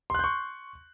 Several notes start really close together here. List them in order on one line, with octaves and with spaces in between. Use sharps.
C6 F#6 G6 C#6